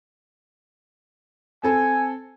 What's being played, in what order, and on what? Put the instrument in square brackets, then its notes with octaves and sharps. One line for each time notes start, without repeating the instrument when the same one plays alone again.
[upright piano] C4 A4 [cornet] G#5